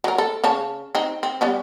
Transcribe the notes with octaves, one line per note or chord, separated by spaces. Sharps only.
F#3 A#4
A4
C#3 C#5 A5
C4 D#4
C4
G3 B3 C#4